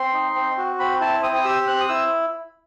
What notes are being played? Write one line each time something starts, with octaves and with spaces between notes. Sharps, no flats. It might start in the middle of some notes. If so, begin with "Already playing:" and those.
Already playing: C4 C6
D#4
C4
F#4
C4 B5
E4 A5
C4 D#6
D#6
G4 E6
C4 F#6
D#6
E4 E6